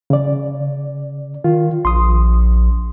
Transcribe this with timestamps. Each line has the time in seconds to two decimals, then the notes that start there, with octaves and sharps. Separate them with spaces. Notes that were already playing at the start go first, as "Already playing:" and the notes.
0.10 C#3 D5
1.44 D#3 F4
1.85 A#1 C6 D#6